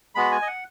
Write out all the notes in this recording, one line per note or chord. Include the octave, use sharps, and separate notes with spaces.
G#3 B3 F#4 B5
G#5
D#5
F#5